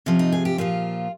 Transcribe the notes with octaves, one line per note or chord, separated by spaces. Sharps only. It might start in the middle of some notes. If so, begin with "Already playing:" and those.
C3 F3 C#4
D#4
G#4
G4
A#2 F3 F4